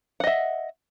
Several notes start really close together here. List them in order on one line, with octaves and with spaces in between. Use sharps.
F#5 D#5 E5